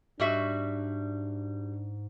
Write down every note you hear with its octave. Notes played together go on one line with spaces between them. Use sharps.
G#2 G3 D4 F#4 E5